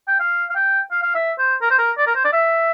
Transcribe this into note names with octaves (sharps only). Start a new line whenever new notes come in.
G5
F5
F5
G5
F5
F5
E5
C5
A#4
C5
A#4
D5
A#4
C5
D5
E5